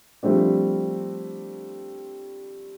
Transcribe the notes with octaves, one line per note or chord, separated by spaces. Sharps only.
F3 G3 A3 C4 D4